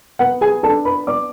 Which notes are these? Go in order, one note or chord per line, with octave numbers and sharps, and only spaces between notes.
B3 F#5
G#4 G#5
D4 A4 A5
B4 B5
B3 D5 D6